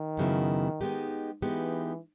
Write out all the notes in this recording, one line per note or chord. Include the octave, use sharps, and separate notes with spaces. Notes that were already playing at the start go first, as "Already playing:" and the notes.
Already playing: D#3
F#2 C#3 F#3 B3 E4
G#3 B3 D#4 G4
E3 G#3 B3 D#4 G4